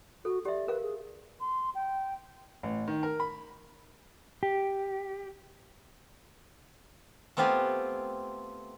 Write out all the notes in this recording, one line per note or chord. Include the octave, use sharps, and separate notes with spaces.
F#4 A4
G4 D5 E5
A#4 B4 F5
G#4
C6
G5
A1
D#3
A#4
B5
G4
A3 B3 C4 F4 G4 G#5